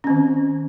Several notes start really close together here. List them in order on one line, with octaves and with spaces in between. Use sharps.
C#4 C4 D#3